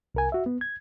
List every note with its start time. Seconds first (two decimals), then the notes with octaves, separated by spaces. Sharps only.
0.15 C2 A#4 G#5
0.32 F#4 E5
0.46 B3
0.61 G#6